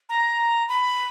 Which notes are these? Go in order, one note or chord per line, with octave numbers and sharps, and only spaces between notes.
A#5
B5